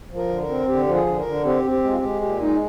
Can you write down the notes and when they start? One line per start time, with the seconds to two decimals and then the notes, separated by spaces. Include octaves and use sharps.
0.10 F3
0.17 A#4
0.29 D3
0.43 A#4
0.49 C4
0.68 D3 G4
0.87 F3
0.94 G#4
1.07 D3
1.19 A#4
1.26 D3
1.45 C4 G4
1.64 C4
1.71 G4
1.84 G#3
1.92 F4
1.96 G4
2.02 G#3
2.22 A#2 G4
2.41 G#3 D#4